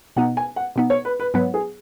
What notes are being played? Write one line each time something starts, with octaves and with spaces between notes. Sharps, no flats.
B2 B3 D#4 F#5
G#5
F#5
B2 B3 D#4
C#5
B4
B4
G#2 F#3 B3 B4
G#4